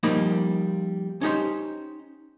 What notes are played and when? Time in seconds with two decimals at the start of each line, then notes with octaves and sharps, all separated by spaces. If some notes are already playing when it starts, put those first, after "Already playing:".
0.03 F3 G3 A#3 D#4 B5
1.21 C#4 D#4 G4 C5